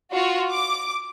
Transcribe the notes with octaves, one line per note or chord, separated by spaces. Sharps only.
F4 F#4
D6